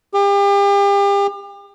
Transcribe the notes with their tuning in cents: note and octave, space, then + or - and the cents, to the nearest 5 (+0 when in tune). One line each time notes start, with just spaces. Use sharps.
G4 +40